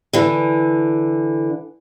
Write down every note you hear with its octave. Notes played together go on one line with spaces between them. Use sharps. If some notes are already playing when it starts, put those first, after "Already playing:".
D3 E3